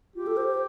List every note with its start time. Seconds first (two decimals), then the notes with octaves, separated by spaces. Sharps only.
0.16 F4 G4
0.26 A4
0.37 C5
0.48 C5